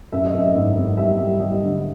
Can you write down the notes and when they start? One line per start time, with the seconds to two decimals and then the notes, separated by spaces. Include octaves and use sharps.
0.12 F#2 E5
0.26 D#5
0.33 F#2 E5
0.55 G#1
0.76 G#1
0.97 G3 E5
1.18 G3
1.40 G3 D#5
1.62 D3